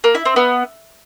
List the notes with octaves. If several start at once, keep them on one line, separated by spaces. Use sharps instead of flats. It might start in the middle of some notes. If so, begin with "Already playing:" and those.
A#3
E4
C4
B3